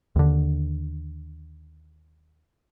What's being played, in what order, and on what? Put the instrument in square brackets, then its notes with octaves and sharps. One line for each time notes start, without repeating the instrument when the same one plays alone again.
[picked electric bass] D#2 D3